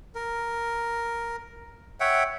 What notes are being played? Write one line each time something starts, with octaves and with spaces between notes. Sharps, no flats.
A#4
C#5 E5 F#5 G5